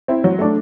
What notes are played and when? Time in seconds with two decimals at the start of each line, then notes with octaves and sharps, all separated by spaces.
0.08 C4 E4
0.24 F#3
0.39 A3 D4